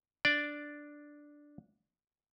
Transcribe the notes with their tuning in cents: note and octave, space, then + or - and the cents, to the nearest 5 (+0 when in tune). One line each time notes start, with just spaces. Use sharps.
D4 +0 D5 +0